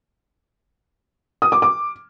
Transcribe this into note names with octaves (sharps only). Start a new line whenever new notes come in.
D#6
D6
D6